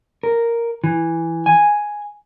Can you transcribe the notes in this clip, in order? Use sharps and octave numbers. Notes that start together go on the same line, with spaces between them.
A#4
E3
G#5